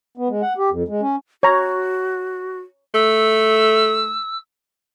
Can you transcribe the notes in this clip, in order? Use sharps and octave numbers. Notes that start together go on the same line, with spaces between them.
B3
G#3
F#5
G4
F2
G#3
C#4
F#4 C#5 A#5
A3 E6